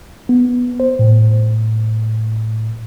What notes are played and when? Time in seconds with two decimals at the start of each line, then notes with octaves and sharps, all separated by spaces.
0.29 B3
0.80 C5
0.99 A2